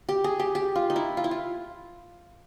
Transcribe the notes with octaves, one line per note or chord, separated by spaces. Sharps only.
G4
G#4
G4
G4
F4
D#4
E4
F4
E4
F4